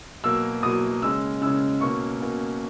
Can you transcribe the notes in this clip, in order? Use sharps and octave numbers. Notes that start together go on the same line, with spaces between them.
B2 F#3 A#3 E6
B2 F#3 A#3 D#6
C#3 G#3 C#4 E6
C#3 G#3 C#4 E6
B2 A#3 C#4 C#6
B2 A#3 C#4